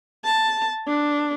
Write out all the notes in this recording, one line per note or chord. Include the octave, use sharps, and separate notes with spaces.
A5
D4